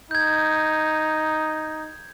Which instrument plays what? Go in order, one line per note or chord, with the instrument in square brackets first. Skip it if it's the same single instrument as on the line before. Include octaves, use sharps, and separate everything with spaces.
[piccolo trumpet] D#4 [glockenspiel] G6 G#6